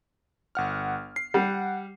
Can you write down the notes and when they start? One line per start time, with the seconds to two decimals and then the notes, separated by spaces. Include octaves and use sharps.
0.55 G1 F#5 F6
1.16 C7
1.34 G3 F#5